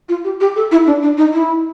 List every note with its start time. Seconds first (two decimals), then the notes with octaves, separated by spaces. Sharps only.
0.09 F4
0.24 G4
0.40 G4
0.56 A4
0.72 E4
0.87 D4
1.02 D4
1.18 D#4
1.33 E4